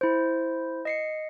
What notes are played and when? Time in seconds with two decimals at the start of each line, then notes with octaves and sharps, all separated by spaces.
0.01 E4 C5
0.85 D#5 C7 C#7